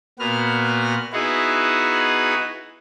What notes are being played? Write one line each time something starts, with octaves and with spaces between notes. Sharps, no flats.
A#2 B3 F#4 F6
B3 D#4 E4 F#4 G#4 B4